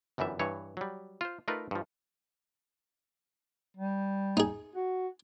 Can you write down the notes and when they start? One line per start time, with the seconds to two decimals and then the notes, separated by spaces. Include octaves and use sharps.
0.18 G1 F#2 E3 G3 E5
0.39 G2 E3 C#5
0.77 F#3 G3
1.21 F4 C5
1.48 A3 D#4 F4 A#4 B4 D5
1.71 G2 F3
3.77 G3
4.37 D#4 G#4
4.75 F#4